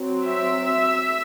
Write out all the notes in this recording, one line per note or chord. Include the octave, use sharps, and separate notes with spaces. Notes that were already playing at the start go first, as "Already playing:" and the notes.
Already playing: F#3 C4
E5